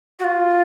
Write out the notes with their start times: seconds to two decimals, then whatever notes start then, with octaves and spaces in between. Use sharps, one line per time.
0.19 F#4
0.24 F4